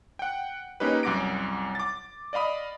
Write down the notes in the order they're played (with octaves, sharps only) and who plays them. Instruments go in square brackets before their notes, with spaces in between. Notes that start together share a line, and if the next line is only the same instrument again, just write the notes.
[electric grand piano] F#5 G5
A#3 C#4 D#4 G4 B4
C2 F#2 F#5 D6 A#6 D7
D6 A6
D5 D#5 F5 B5 D#6